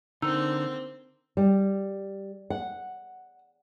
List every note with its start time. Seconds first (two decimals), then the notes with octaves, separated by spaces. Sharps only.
0.22 D3 A#3 C4 D#4 E6
1.37 G3
2.50 F#5